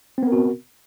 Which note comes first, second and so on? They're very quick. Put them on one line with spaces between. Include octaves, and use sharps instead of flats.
C4 B3 A#4 F#4